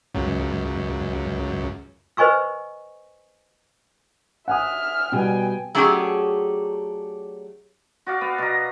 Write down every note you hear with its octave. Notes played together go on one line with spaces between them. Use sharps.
C#2 F#2
B4 C5 D#5 G#5 C#6 E6
E5 F#5 G#5 D#6 F6
B2 G3 B3 G5 G#5
F#3 A3 C#4 D4 G4 G#4
F#4 D5 F5
B3
B2 A#5